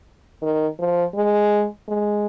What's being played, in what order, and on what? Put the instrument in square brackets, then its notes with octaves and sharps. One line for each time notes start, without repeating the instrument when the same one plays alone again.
[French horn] D#3
F3
G#3
G#3